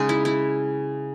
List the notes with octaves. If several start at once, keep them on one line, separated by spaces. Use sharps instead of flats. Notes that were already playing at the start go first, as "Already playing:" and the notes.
Already playing: C#3 G#3 D#4 G#4
E4
E4